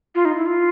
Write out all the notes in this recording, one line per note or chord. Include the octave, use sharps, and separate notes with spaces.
F4
D#4
E4
F4